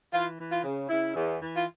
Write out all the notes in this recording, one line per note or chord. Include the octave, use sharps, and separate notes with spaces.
E3 F4
E3
F4
C#3
C#3 E4
E2
E3
F4